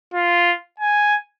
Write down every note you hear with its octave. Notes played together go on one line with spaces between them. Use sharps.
F4
G#5